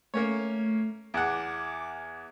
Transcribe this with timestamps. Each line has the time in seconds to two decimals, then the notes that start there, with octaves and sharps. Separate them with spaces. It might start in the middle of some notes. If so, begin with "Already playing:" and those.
0.14 A3 A#3 C#4 C#5
1.14 E2 F#5 D6